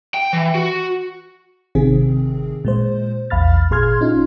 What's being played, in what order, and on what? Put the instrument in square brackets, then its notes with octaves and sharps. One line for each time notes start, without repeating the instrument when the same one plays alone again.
[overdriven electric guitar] G5
E3
F#4
[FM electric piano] G#1 C3 D#3 C4 G#4
A#2 G#3 C5
A#1 E2 F5 B5 F6 A6
G#1 A#2 G#4 C6 F6 G#6
C#4 D#4 F4